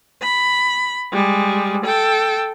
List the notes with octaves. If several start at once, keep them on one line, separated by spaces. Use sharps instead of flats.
B5
G3 G#3
A4 G5